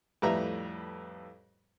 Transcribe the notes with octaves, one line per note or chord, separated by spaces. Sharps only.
F2 A2 G3 B4 E5 A#5